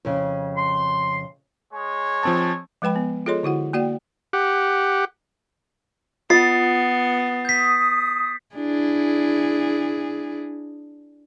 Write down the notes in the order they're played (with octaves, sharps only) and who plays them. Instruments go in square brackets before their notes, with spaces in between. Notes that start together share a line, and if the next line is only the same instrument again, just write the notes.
[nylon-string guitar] F2 C#3
[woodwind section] C6
[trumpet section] G#3 G#4 C#5
[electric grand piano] F3 C4 A5
[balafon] F3 G#3 B4 G5 B5
B3
F4 G#4 A4 C#5 D#5 C6
D3 E4 F#4 F#5
A#3 F#4 D5 F#5 G5
[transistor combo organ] G4 F#5
[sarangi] B3 [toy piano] F4 D#5 [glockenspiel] D#6 A6 C7
[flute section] D#6 [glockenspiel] G6 B6
[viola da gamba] D4 E4 G#4